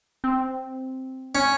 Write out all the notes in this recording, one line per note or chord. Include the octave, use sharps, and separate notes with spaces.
C4
C#4